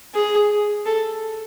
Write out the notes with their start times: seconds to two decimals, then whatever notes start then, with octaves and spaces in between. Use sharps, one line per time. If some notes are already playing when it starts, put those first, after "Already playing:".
0.15 G#4
0.86 A4